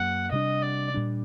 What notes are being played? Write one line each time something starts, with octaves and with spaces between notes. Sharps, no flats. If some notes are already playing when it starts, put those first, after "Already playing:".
Already playing: F#2 F#3 A#3 F#5
C3 G3 A#3 D4 D#5
D5
A#2 G3 D4